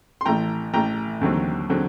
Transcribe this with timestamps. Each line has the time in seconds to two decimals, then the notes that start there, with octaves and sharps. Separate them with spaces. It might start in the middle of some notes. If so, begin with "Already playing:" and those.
0.21 C6
0.25 A1 A2 A3 G5 A#5
0.74 A1 A2 A3 G5 A#5
1.21 D#2 D3 F#3 C4
1.70 D3 F#3 C4